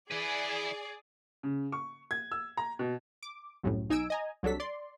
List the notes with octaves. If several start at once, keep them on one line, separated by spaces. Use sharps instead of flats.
E4 G#4 B4 D5
C#3
C#6
G#6
E6
A#5
B2
D6
C2 F#2 A2
B1 D#4 G#5 E6 D7
D#5 G#5 A#5
C2 F#3 D4 A4 B6
D5 C6